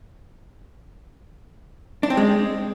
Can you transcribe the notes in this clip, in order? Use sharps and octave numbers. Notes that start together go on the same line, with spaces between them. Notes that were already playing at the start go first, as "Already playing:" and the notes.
D4
C4
G#3